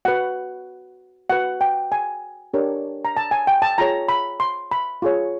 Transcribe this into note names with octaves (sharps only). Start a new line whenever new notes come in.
F#4 B4 F#5
F#4 B4 F#5
G5
G#5
D4 G4 A#4 C#5
A#5
A5
G#5
G5
A5
F4 G#4 C#5 A#5
B5
C6
B5
F4 G#4 C#5